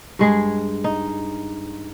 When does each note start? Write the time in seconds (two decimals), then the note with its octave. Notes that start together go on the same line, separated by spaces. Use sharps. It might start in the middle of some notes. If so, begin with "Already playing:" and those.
0.19 G2 G#3 G#4
0.84 D#4